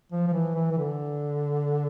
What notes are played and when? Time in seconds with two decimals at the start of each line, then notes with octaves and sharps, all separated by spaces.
0.12 F3
0.27 F3
0.33 E3
0.55 E3
0.71 E3
0.78 D3